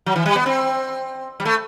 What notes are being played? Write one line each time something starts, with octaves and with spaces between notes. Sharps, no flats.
F#3
E3
G3
B3
C4
G3
A3